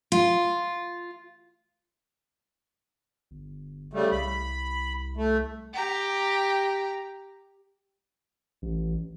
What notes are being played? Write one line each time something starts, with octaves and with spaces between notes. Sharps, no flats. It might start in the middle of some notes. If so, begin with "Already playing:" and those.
F4
G1
C#3 G3 A3
C2 B5
A3
G4 A#5
A1